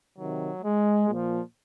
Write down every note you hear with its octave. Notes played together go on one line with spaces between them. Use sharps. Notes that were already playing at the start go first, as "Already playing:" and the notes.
C3 D#3 F#3
G#3
A#2 F3